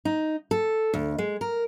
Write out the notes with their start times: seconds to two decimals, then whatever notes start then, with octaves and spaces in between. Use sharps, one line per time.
0.05 D#4
0.51 A4
0.94 D2
1.18 G#3
1.41 A#4